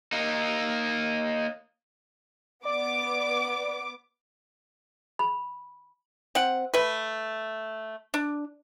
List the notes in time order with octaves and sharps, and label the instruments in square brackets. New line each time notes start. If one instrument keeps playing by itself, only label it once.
[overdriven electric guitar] A#3 D#4
[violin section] B3 D6 [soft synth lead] D5
[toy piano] B5
[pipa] C4 F#5
A3 B4
D4